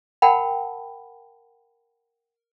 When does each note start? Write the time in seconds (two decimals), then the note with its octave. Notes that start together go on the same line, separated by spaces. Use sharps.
0.22 A#4 F#5 G5 A5 B5